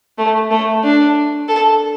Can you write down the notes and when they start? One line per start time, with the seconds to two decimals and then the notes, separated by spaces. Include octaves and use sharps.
0.18 A3
0.51 A3
0.84 D4
1.49 A4